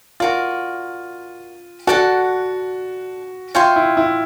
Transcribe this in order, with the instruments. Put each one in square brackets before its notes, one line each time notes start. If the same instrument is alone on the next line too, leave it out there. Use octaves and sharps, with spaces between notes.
[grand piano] F4 [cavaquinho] F#4 A#4 D5
[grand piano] F#4 [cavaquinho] A4 D5 F#5 A5
[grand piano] F4 [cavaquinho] C#5 E5 G5 C6
[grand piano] E4
E4